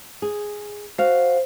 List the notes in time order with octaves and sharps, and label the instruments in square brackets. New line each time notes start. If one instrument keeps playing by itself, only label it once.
[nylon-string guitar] G#4
[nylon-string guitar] F#4 F5 [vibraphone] C5